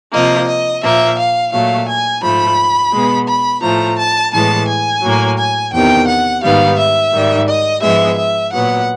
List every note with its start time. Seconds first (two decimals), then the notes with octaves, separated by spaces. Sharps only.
0.13 C3 F3 A#3 D#5
0.48 D#5
0.83 A#2 F3 A#3 E5
1.18 F5
1.53 A#2 F#3 A3 F5
1.89 G#5
2.23 G#2 F3 A3 B5
2.94 B2 G#3 B3
3.28 B5
3.63 A2 F3 A3 A#5
3.98 A5
4.33 A2 E3 G#3 B3 A5
4.68 G#5
5.03 A2 F#3 A#3
5.38 G#5
5.73 E2 C3 D#3 G5
6.08 F#5
6.43 G#2 D#3 G3 B3 F5
6.78 E5
7.13 G#2 D#3 G3
7.48 D#5
7.83 G#2 F3 G#3 B3 E5
8.18 E5
8.53 A#2 F#3 B3 F#5